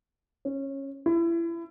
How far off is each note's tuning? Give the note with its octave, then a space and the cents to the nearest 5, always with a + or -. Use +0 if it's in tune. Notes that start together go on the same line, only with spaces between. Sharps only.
C#4 -20
E4 +30